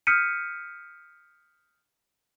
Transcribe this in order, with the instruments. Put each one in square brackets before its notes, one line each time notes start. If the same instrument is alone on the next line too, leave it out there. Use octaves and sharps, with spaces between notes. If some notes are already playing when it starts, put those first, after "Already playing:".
[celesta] D#6 F6 G6 B6 C#7 D#7